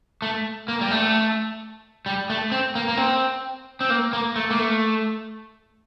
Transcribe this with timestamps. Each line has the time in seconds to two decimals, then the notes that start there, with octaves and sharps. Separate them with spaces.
0.22 A3
0.68 A#3
0.81 G3
0.91 A3
2.06 G3
2.30 A3
2.52 C4
2.75 A#3
2.88 A#3
2.97 C4
3.81 C4
3.90 A#3
4.13 A#3
4.36 A3
4.51 A#3
4.59 A3